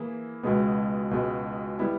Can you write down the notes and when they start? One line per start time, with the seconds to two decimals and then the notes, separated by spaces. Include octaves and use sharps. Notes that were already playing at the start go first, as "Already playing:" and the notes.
Already playing: E3 A#3 E4 G#4
0.43 C#2 B2 G#3 B3
1.11 C#2 B2 G#3 B3
1.79 G3 B3 E4